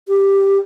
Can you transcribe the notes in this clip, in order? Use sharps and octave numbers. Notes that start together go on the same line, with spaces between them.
G4